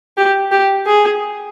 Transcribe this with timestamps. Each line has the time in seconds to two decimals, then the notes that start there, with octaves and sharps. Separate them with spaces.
0.17 G4
0.51 G4
0.86 G#4